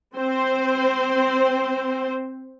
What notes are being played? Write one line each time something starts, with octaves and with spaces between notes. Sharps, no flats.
C4 C5